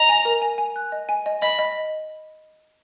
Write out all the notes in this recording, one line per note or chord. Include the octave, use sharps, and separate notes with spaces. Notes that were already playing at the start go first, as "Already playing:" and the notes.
Already playing: D#5 A#5
G#5
A#4
G#5
G#5
F#6
D#5
G#5
D#5
D#5 B5
D#5